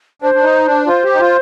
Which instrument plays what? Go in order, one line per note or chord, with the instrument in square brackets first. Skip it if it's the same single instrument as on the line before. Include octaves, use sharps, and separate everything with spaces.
[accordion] D4 [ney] C5
[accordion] D4
D#4
D4
[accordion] F4 [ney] C5
[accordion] G4
D#4
F4